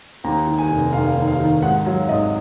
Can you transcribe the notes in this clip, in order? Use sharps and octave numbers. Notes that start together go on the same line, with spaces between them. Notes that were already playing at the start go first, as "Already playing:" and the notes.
D#2 A#5
D#3
G#5
F1
F1 F5
D#2
F5
D#3
G#2 F#5
F#3 F5
G#1 D#5